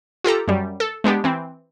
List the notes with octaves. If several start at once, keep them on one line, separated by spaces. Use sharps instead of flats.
F4 G4 A4 A#5
F#2 G3
A4
G#3 B3 D4 G4
E3 C4